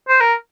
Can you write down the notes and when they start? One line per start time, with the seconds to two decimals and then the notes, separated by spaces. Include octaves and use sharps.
0.08 C5
0.20 A#4